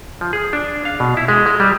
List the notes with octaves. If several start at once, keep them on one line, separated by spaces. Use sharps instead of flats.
F3
G#4
D4
F5
B2
E4
G#3
G#3
G3